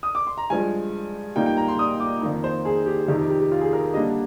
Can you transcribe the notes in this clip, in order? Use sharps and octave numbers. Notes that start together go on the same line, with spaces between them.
D#6
D6
C6
A#5
G2 F3 G#3 G#5
A#2 G3 A#3 D#4 G5
G5
A#5
C6
D#6
D6
F2 D#3 A#3 D#4
C5
G#4
G4
F2 C3 D#3 G4
G4
G4
G4
F4
G#4
A#4
D3 G3 A#3 D4 D#5